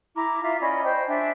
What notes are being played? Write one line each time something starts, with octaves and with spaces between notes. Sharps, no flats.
E4 A#5 D6
F4 E5
C#4 D5 D#5 B5
C5 G5
D4 E5 G#5